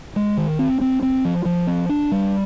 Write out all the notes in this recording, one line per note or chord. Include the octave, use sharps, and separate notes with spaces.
G#3
D#3
C4
C4
C4
F3
F3
C4
D4
G3